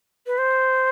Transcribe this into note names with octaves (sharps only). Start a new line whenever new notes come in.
B4
C5